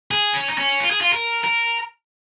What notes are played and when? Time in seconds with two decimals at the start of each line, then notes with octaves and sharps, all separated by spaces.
0.11 G#4
0.34 C#4
0.50 D#4
0.58 C#4
0.80 F4
0.91 G#4
1.01 F4
1.13 A#4
1.44 A#4